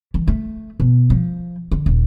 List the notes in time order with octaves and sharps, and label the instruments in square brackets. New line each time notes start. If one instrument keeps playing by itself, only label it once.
[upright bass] E3
A3
B2
F3
D3
D#1